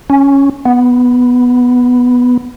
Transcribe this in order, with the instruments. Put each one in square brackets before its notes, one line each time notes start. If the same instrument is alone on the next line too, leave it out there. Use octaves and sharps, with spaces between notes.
[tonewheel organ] C#4
B3